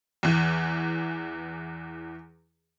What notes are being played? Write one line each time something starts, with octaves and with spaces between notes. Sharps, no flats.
E2 E3